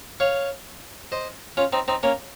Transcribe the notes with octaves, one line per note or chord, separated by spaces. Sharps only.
C#5 F5
C5 D#5
C#4 F4
C4 D#4
C4 D#4
A#3 C#4